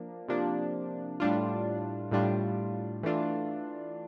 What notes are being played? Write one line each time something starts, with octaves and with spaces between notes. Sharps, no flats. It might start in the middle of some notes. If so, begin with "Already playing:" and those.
Already playing: F3 A#3 D4
C3 F3 A#3 D4
A2 G3 D4 F4
A2 G3 D4 F4
E3 A3 D4 F4